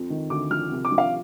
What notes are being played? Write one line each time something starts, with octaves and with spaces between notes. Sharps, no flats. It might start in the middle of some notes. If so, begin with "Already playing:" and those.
Already playing: F2 F3
D#3
D2 D6
F3 F6
C2
D6
F3
F5